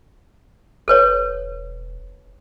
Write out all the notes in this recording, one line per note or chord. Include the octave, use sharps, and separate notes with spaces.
E1 A4 B4 C#5